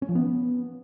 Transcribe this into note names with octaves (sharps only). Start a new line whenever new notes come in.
C#4
F3
B3